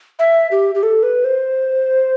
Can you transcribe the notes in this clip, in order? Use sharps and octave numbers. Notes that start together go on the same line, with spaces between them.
E5
G4
G4
A4
B4
C5